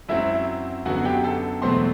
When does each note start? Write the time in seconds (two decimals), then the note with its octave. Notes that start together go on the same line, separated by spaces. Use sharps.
0.09 F#2 F#3 C4 E4 E5
0.86 F#2 D3 F#3 B3 F#4 F#5
1.05 G4 G5
1.24 A4 A5
1.62 E2 B2 F#3 A3 C4 C5 C6